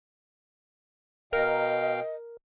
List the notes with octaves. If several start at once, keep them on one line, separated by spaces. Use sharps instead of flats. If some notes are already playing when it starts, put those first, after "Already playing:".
B2 A#4 D#5 F5 G5